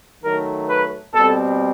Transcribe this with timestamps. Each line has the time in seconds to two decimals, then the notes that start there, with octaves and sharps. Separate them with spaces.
0.23 D#3 F#3 A3 A#4
0.68 B4
1.14 B2 G3 C4 A4